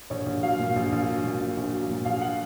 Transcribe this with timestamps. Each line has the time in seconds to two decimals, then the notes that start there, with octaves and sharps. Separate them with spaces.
0.10 A#1 C#5
0.26 A#1
0.42 F#3 F5
0.59 A#2
0.76 A#1
0.92 A#1
1.08 F#3
1.24 A#2
1.40 A#1
1.57 A#1
1.73 F#3
1.90 A#2
2.05 A#1 F5
2.21 F#5